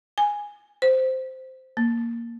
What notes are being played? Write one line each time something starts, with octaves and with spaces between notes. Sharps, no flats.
G#5
C5
A#3